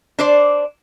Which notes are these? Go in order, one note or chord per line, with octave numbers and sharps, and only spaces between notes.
D4 C5 D5